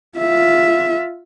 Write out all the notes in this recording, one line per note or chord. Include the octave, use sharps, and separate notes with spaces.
F4 E5